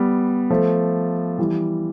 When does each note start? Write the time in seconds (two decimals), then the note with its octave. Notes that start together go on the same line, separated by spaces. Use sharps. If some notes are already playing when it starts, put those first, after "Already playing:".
Already playing: G3 B3
0.50 F3 A3
1.38 E3 G3